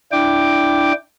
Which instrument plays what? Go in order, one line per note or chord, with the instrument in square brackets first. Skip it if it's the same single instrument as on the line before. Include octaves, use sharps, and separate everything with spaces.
[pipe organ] D4 E4 G5 D6